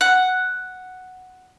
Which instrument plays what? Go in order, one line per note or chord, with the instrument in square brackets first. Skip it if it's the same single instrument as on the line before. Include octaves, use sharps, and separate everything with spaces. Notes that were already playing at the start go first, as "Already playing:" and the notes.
[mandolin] F#5